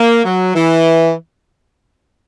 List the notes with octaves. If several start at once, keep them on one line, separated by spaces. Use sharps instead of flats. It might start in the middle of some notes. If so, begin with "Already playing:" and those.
Already playing: A#3
F#3
E3